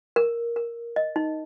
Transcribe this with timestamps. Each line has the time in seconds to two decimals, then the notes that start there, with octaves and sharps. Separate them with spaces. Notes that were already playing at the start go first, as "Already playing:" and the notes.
0.16 A#4
0.56 A#4
0.96 D#5
1.16 D#4